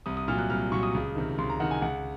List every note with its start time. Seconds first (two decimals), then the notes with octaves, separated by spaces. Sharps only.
0.06 C2 D#6
0.17 D#6
0.28 A#2 F#3 F6
0.38 F#6
0.50 C2 F6
0.72 A#2 F#3 C#6
0.83 D#6
0.94 C#2
1.15 C3 D#3
1.38 C#2 C6
1.50 A#5
1.60 C3 D#3 F#5
1.71 G#5
1.82 C#2 F#5